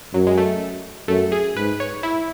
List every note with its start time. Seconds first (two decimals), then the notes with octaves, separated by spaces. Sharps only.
0.14 F#2 F#3
0.27 G#3
0.38 A3
1.08 F#2 A3
1.32 G#4
1.56 G#2 B4
1.80 C#5
2.03 E4